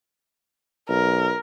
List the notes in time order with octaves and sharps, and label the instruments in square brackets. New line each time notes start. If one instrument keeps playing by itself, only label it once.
[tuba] B1 [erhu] A#4